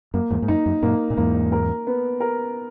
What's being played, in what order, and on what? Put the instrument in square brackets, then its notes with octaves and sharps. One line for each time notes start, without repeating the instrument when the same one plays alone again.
[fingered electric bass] F#2 [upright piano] A#3
[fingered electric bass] E2 G#2
G#2
[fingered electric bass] F#2 [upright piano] D#4
[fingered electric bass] F#2
[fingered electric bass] F#2 A#2 [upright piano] A#3
[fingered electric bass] A#2
[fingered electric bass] E2 G#2 [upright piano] A#3
[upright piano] A#4
B3
A#4